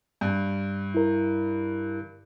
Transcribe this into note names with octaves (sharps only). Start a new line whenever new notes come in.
G2
E4 A#4